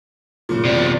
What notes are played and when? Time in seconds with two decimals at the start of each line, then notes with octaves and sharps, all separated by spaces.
0.49 F#1 A#2
0.65 E2 C3 D5